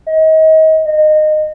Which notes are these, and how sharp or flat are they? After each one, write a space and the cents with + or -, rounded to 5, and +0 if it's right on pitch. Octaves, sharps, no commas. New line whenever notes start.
D#5 +30
D#5 -20